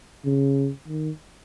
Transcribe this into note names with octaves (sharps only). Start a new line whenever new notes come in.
C#3
D#3